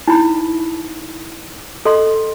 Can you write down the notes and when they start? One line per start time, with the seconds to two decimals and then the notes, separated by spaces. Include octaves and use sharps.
0.07 D#4 E4 B5
1.85 A4 D#5 C6